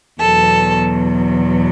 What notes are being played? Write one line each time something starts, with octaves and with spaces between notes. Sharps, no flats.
E2 B2 F#3 A4